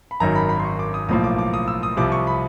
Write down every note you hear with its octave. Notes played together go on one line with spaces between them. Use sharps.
B5
G#1 F#2 D#3 F#3 A#5
B5
B5
C6
C#6
D6
D#6
B1 A2 F3 A#3 D#6
D6
D6
D#6
E6
D#6
C2 C3 F3 D6
C#6
B5